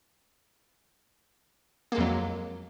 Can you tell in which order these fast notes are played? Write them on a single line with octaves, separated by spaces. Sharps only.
A#3 G#3 F2 F#3